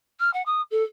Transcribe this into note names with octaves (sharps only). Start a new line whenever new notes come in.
F6
F#5
D#6
A4